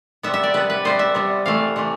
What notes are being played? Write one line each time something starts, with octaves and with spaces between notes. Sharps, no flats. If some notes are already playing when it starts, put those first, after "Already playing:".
C3 G3 B3 E5
E5
D5
C3 G3 B3 B4
B4
C3 G3 B3 C5
E5
C3 G3 B3
C3 E3 A3 F5
C3 E3 A3